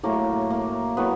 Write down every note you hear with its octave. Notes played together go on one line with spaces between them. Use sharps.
A2 F#3 A3 A#3
A#3
A2 F#3 A3 B3